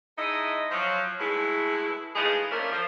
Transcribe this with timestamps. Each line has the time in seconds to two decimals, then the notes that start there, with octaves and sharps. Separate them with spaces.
0.18 G#3 D#4 E4 A4 D#5
0.71 F3 F#3
1.19 B2 G#3 A3 E4
2.16 E3 G#3 A3 D#4 F4 G#4
2.52 F3 A3 C#4 D4 F4 A#4
2.71 F3